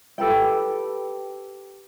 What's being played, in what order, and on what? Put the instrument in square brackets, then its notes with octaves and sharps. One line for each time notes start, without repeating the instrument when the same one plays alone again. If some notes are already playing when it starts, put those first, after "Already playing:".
[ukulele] G4 A4 B4 G5